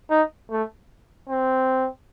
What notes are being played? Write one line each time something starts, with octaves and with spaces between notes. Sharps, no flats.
D#4
A3
C4